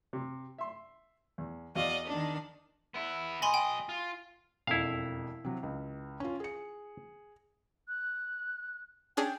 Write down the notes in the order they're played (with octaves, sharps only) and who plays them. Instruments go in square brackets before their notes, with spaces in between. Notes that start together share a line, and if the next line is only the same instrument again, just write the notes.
[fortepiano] C3
E5 C6
E2
[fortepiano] E2 F#4 F5 [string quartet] D5 D#5
[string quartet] D#3 D4
[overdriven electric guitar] B3 E4
[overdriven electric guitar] B1 D#5 [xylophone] G#5 B5 C6
[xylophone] G5
[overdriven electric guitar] F4
[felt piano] E1 F2 [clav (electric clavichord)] E4 F5
[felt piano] C3 F#3
C#2
C#4 F4
G#4 C#7
[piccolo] F#6
[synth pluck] C#4 D4 G#4 [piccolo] G5